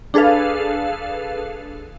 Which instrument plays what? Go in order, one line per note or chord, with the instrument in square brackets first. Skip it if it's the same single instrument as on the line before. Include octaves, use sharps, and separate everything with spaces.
[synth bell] D4 G#4 A4 B4 F5